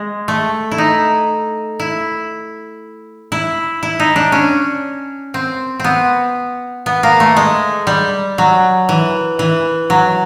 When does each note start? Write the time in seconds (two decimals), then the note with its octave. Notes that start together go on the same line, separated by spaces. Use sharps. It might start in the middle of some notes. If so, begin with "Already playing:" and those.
Already playing: G#3
0.28 A3
0.71 E4
0.78 D#4
1.80 E4
3.32 E4
3.83 E4
4.00 D#4
4.16 D4
4.32 C#4
5.34 C4
5.80 B3 C4
6.86 B3
7.03 A#3
7.20 A3
7.36 G#3
7.87 G3
8.38 F#3
8.89 E3
9.39 E3
9.90 F#3